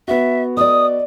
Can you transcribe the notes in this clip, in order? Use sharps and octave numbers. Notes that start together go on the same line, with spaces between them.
B3 F#4 E5
D5 D#5 D#6